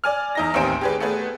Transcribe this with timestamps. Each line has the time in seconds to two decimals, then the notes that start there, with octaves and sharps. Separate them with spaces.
0.04 D5 G#5 F6
0.35 E2 D#4 A#6
0.54 A1 D#2 D#3 C4 G#5 D7
0.81 G4 G#4 B4
1.00 A3 B3 G#4 B4